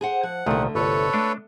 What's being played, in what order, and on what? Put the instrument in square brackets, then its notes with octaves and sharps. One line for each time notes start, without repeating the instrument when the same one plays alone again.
[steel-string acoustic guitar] G#4 C5 F#5
[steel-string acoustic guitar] F3 [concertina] F#5
[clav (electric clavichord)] C2 A#2 D#3 [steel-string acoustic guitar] D3 A3
[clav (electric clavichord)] G1 C2 [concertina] A4 B4 C#5
[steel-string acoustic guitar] A3 [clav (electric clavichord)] D4